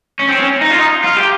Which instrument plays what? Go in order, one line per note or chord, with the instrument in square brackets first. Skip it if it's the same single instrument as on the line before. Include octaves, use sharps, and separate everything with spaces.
[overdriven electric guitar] C#4
C4
C#4
D#4
F4
D#4
F4
G4